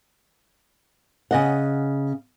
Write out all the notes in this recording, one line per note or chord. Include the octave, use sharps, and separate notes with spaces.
C#3 D#5 F#5